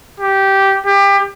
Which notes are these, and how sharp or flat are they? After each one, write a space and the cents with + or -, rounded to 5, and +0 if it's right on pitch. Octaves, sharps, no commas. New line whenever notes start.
G4 -10
G4 +25